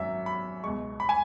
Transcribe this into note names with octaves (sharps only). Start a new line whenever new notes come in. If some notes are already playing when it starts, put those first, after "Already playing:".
Already playing: G#1 F#2 F#3 E5
B5
C#2 B2 G#3 C#6
B5
G#5